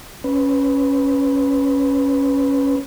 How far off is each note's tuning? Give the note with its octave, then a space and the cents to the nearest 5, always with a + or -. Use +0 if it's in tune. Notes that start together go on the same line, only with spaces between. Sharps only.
C#4 +0 B4 +5